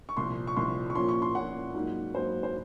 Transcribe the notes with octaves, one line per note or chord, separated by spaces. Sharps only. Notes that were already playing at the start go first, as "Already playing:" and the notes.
C#6
C2 A#2 F3 C6
C#6
C2 A#2 F3 C6
C#6
A#2 F3 A#3 C#4 C6
C#6
C6
A#2 F3 A#3 C#4 F#5
G#2 F#3 A#3 D#4
G#2 F#3 A#3 D#4 C5
C5